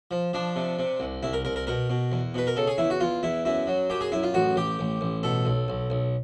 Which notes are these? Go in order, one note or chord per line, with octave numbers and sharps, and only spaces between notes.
F3
F3 D4
C3
C3
C2
C2 E4
A#4
C2 A#4
A#4
B2 A#4
B2
E2
B2 B4
A#4
C#3 A4
G#4
E2 E4
F#4
E2 F4
E2 E4
F#2 E4
F#3
F#2 G4
G#4
F#2 E4
F4
A1 F#4
A1 G4
A1
A1
B2 A4
B1
B1
B1